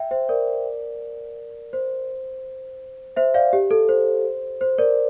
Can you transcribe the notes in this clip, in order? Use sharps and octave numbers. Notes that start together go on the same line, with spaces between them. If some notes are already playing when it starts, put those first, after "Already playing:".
Already playing: E5 G5
C5 E5
A#4 D5
C5
C5 E5
D5 F5
G4
A4
C5
C5
A#4 D5